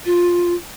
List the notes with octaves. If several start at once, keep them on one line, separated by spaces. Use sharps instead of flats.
F4